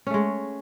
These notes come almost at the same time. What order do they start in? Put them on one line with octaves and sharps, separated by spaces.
C#4 A3 G#3